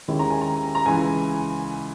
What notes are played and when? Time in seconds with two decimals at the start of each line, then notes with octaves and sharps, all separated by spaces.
0.08 D#2 D#3 G#3 C#4 E4
0.19 A#5
0.31 G#5
0.41 A#5
0.75 A#5
0.86 C#2 C#3 E3 G#5